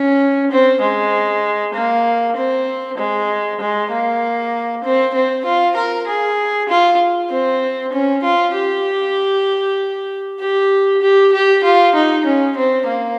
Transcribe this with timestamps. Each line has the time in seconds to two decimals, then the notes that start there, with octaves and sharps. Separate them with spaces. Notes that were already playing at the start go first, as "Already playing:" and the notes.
Already playing: C#4
0.51 C4
0.81 G#3
1.74 A#3
2.36 C4
2.98 G#3
3.60 G#3
3.91 A#3
4.84 C4
5.14 C4
5.45 F4
5.76 A#4
6.07 G#4
6.69 F4
7.30 C4
7.92 C#4
8.23 F4
8.55 G4
10.40 G4
11.02 G4
11.32 G4
11.64 F4
11.95 D#4
12.25 C#4
12.57 C4
12.87 A#3